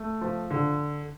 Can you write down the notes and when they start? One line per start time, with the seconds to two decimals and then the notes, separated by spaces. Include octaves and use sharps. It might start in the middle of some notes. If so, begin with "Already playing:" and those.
Already playing: A3
0.21 F3
0.51 D3